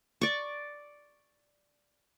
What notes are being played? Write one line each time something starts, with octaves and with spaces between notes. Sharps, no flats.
D5 C#6